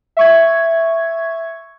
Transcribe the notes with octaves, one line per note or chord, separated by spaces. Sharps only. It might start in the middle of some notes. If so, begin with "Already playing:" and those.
E5 C#6 G#6